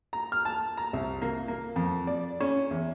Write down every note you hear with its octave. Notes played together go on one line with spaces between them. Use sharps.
A#5
F6
A5
A#5
C2
A#3
A#3
F2
D5
C#4
E2